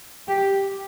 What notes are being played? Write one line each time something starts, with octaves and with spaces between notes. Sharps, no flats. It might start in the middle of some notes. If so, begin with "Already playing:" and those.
G4